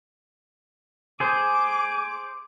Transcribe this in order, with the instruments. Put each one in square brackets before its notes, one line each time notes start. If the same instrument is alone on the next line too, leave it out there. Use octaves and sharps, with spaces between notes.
[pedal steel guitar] G#4 C5 [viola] D6